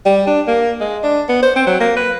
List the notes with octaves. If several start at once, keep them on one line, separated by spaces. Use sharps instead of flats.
G3
D4
A#3
G#3
D4
B3
C5
C4
F#3
A#3
B4